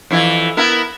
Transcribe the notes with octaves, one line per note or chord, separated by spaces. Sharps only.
F2 E3 E4
B3 E4 A#4